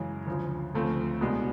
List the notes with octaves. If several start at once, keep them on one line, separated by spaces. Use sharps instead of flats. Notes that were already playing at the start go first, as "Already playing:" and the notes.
Already playing: F#2 C#3 E3 G#3
D2 C#3 F3
D2 C#3 F3 A3 C4
C2 B2 G#3 B3 D4